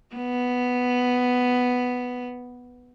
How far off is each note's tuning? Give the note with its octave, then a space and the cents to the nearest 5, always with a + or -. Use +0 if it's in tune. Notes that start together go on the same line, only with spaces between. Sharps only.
B3 +5